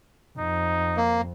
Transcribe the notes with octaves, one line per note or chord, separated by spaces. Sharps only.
F2 D#4
A#3